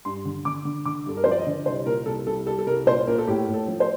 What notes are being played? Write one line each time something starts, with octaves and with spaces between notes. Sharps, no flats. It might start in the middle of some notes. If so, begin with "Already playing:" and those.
G2 C6
D3
D3 D6
D3
D3 D6
G2 A4
A#4
C5
F3
D5
D#5
D3
C2 C5
A#2 A#4
C2 A4
C2 A4
G3 A4
A4
C2 A#4
A#2 C5
A#2 A#4
A4
A2 G4
A2
A4
F3
C5